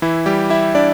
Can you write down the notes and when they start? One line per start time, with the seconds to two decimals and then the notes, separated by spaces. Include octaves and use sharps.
0.02 E3 E4
0.26 G3 G4
0.50 E4 E5
0.75 D4 D5